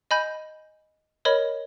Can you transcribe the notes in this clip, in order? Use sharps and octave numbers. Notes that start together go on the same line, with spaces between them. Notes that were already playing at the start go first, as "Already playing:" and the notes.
D#5 G#5 B5 G6
A#4 C#5 D#5 B5